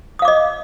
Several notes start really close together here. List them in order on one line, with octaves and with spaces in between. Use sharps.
D#6 F5 D6 D#5